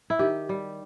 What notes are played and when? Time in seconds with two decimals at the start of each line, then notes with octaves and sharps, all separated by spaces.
0.10 E4
0.19 D#3 G4
0.49 G3